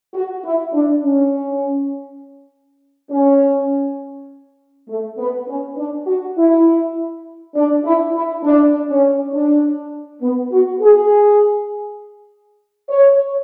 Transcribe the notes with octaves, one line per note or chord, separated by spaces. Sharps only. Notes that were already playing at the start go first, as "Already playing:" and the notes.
F#4
E4
D4
C#4
C#4
A3
B3
C#4
D4
F#4
E4
D4
E4
E4
D4
C#4
D4
B3
F#4
G#4
C#5